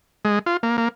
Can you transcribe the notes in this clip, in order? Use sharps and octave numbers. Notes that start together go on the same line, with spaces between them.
G#3
F4
A#3
A#3